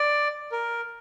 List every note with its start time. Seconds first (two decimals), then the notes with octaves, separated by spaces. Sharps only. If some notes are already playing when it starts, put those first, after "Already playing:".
Already playing: D5
0.52 A#4